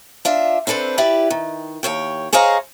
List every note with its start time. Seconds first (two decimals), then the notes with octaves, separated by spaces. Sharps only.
0.25 D4 F4 E5
0.67 C4 D4 A4 B4 C5
0.98 E4 G4 B4 D5
1.30 D#3
1.83 D#2 E3 C#5 G5
2.33 G#4 C5 C#5 D#5 F5 A#5